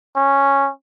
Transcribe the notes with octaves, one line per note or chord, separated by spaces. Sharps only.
C#4